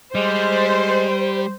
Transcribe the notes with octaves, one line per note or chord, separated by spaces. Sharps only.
G3 G#3 C5